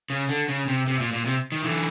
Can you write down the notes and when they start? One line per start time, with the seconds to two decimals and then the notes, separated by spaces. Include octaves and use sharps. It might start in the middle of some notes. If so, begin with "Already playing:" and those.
0.10 C#3
0.29 D3
0.48 C#3
0.68 C3
0.88 C3
1.00 A#2
1.13 A#2
1.26 C3
1.52 D#3
1.64 D3 E3